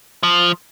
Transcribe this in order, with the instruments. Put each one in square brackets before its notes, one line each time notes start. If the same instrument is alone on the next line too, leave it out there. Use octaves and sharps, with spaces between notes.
[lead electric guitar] F3